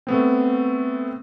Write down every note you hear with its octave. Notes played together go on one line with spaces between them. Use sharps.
A3 B3 C4